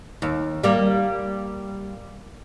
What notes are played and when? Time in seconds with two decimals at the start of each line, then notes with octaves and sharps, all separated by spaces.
0.22 D#2
0.64 G3 A#3